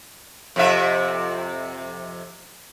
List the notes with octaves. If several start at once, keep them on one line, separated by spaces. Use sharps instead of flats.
F2 C3 E5